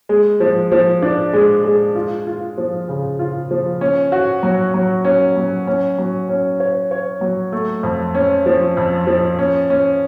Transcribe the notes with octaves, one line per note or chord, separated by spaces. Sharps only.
G#3
F3
F3
D4
G#3
G#3
F4
F4
F3
C#3
F4
F3
C#4
F#4
F#3
F#3
C#4
F#3
C#4
F#3
C#4
C#5
C#5
F#3
A3
F2
C#4
F3
F2
F3
C#4
C#4